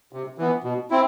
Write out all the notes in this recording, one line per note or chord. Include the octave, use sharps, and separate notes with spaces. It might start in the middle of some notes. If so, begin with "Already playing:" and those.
C3
E3 B3
B2
C4 E4